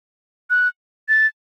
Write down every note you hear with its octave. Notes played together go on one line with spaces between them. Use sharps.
F#6
A6